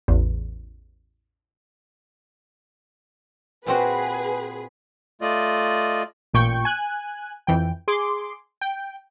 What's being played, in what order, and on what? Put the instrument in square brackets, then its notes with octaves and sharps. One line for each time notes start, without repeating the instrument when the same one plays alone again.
[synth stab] A1 E2
[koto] A#2 C4 F#4 [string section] G#4 B4
[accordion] A3 F4 D5 D#5
[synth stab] A1 A#2 G5 C#6 G6
G#5 F#6
F2 E3 G5
G#4 C6 D6
G5